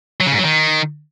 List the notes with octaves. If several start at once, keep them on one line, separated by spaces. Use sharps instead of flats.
F#3
C#3
G#2
F#3
D#3